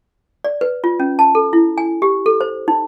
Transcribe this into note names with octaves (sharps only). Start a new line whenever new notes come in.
D5
B4
F4
C#4
A5
A4
E4
G#5
G4
A4
C5
D#4